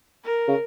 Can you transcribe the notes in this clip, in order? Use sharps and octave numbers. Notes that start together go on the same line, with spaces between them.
A#4
C#3